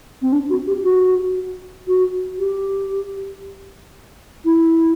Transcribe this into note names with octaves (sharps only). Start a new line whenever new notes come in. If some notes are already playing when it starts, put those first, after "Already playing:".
C4
D4
F#4
G4
F#4
F#4
G4
E4